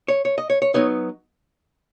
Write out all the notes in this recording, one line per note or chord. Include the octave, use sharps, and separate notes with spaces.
C#5
C#5
D#5
C#5
C#5
F#3 B3 D#4 C#5